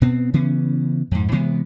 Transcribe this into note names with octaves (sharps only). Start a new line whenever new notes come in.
B2 B3 C4
C#3 E3 B3 C#4
F2 G#2
C3 E3 G#3 B3